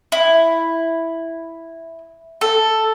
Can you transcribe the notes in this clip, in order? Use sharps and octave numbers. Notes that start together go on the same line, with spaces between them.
E4
A4